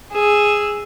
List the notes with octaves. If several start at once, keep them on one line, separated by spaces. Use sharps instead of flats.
G#4 E6